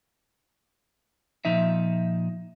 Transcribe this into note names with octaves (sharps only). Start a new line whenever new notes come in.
A#2 F3 D#4 E5